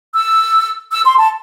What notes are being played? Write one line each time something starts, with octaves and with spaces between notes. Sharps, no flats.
E6
E6
C6
A5